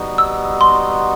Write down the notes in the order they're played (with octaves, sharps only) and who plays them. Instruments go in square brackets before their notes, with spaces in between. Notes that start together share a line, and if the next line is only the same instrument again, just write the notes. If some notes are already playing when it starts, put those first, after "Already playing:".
Already playing: [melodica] G3 B3 D#4 F#4
[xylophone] E6
C6